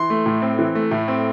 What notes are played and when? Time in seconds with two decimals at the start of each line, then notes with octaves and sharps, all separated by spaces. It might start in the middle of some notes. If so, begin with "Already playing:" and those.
Already playing: E3 C6
0.10 A3
0.26 A2
0.42 C4
0.59 E3
0.75 A3
0.91 A2
1.08 C4